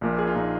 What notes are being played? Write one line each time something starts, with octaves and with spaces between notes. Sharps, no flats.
A#1 A#2 A#3
G#4
F4
A#2 A#3 D#4